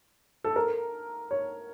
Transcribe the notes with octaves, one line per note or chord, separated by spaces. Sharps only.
A4
A#4
C#5